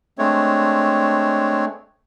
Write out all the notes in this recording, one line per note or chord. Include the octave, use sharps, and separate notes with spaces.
G#3 A3 C4 D4 C#5